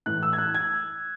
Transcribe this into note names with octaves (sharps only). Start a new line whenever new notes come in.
A2 E3 F#6
E6
G#6
F#6
G#6